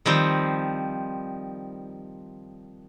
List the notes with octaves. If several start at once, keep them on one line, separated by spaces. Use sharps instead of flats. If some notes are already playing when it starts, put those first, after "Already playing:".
D#3 F3 G3 C4